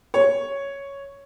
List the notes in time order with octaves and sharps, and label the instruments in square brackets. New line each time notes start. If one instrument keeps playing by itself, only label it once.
[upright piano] C#5